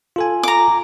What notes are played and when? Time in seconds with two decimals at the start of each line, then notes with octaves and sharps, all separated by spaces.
0.16 F4 A4 G#5
0.43 A#5 D6